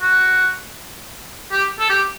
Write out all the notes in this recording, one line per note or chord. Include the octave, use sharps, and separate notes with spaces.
F#4
G4
A4
G4